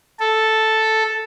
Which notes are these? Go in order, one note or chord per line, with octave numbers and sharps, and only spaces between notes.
A4